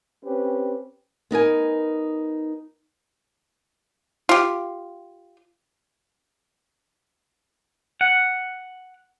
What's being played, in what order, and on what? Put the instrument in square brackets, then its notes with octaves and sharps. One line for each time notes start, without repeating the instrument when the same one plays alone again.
[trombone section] C4 C#4 G4 B4
[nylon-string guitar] B3 D#4 A#4 G#5
[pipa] F4 G4
[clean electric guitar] F#5